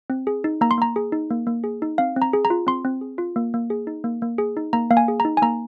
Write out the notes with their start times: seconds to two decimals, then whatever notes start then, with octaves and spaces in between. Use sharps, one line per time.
0.10 C4
0.27 G#4
0.44 D#4
0.61 A#3 A#5
0.71 C6
0.78 A#3 A#5
0.96 G#4
1.12 D#4
1.31 A#3
1.47 A#3
1.64 G#4
1.82 D#4
1.98 C4 F5
2.16 C4
2.22 A#5
2.33 G#4
2.45 A#5
2.50 F4
2.67 C4 C6
2.85 C4
3.01 G#4
3.18 F4
3.36 A#3
3.54 A#3
3.70 G#4
3.87 D#4
4.04 A#3
4.22 A#3
4.38 G#4
4.57 D#4
4.73 A#3 A#5
4.90 A#3 F5
4.97 G#5
5.08 G#4
5.20 A#5
5.25 D#4
5.37 G#5
5.42 A#3 A#5